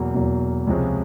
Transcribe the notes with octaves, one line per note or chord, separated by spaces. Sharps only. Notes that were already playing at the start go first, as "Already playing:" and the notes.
Already playing: E2 B2 F#3 A#3
E2 B2 F#3 A#3
C#2 C3 F3 G#3 C#4